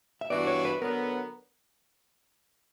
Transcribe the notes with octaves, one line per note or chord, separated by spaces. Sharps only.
E5
G2 E3 B3 D4 F#4 D5
C#5
B4
D3 F#3 B3 A#4